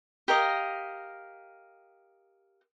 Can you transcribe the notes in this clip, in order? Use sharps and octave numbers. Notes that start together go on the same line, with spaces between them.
G4 A#4 D#5 F5